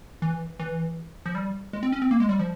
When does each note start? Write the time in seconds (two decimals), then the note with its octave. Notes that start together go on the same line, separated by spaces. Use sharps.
0.22 E3
0.60 E3
1.26 F3
1.35 G3
1.73 G#3
1.83 C4
1.92 C#4
2.02 C4
2.11 A#3
2.20 G#3
2.29 G3
2.40 F3